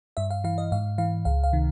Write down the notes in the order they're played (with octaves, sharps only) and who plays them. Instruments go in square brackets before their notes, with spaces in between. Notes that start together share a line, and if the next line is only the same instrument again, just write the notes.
[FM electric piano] G2 E5
F5
E3 F5
D#5
G#2 F5
E3 F5
C#2 F5
F5
C3 D#3